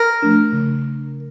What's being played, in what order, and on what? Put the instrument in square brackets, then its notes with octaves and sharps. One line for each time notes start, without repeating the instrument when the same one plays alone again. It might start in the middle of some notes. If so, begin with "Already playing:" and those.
Already playing: [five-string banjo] A#4
[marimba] F3 A3 D4
C#3